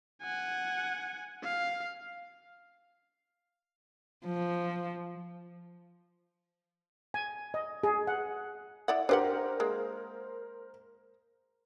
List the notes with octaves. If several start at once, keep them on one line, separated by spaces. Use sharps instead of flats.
F#5 G#5
F5
F3
G#5
D#5
G#4
F#5
E4 D5 F#5
D4 G4 A#4 C5 F#5
G#3 A#3